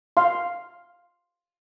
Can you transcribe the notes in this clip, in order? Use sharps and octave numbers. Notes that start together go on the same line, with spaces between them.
F5 C6